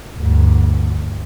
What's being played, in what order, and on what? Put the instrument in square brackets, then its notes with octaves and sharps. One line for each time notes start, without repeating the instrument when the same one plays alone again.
[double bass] D2 G2